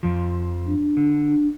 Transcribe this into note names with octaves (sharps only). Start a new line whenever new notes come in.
F2 F3
D4
D3